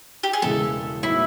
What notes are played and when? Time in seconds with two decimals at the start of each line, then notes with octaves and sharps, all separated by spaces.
0.23 G4
0.33 G#4
0.42 E1 E2 C#3 E3 G#3 A4
1.03 A2 F#3 B3 D#4 E4